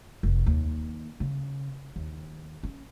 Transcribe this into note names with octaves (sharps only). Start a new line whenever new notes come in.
F1
D#2
C#3
D#2
C#4